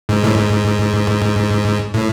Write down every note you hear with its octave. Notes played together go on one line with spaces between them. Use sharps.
G#2
A2
G#2
A2